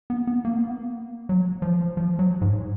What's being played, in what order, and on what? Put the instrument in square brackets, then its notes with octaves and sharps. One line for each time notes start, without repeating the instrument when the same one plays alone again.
[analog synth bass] B3
B3
A#3
B3
A#3
F#3
F3
F3
F#3
G#2